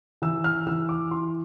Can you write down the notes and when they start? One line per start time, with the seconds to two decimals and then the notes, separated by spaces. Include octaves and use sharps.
0.22 E3 E6
0.44 F6
0.67 E3 E6
0.89 D6
1.11 E4 C6